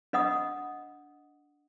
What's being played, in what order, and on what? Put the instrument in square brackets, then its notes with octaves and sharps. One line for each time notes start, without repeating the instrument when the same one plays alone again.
[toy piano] D4 D#5 F#5 D#6